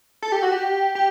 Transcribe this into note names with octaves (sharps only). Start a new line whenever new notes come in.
A4
G4
F#4
G4
G4